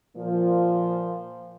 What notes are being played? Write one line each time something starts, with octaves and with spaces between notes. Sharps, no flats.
A#2 F3